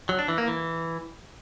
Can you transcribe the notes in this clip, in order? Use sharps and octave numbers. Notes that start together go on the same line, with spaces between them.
F#3
D4
E3
A#3
E3